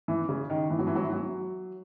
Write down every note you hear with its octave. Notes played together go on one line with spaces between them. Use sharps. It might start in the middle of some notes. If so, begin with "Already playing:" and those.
E3
C#3
D#3
E3
F#3
E3
F#3
E3
F#3